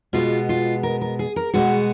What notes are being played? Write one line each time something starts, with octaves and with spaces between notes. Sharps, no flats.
B2 G#3 B3 F4
F4
A#4
A#4
G#4
A#4
B2 G#3 B3 F#4